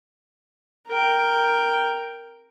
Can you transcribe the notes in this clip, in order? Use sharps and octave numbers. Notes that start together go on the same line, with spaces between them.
A#4 G5